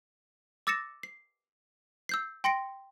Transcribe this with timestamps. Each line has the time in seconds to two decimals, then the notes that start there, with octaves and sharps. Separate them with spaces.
0.67 D6 E6 A6 A#6 C#7 E7
1.03 C7
2.09 E6 G6 C7
2.44 G5 C6 A#6 C#7 D7